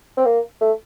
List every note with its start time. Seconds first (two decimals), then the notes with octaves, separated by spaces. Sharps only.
0.17 C4
0.25 A#3
0.61 A3